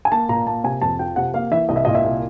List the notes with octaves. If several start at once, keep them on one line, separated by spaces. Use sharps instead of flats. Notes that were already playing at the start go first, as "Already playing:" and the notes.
G#5
A#3 A5
A#2 A#5
A#3 A5
C3 G#5
F2 A5
F3 G5
C3 F#5
A#3 F5
E3 E5
C2 D#5
E5
A#2 D#5
E5
C2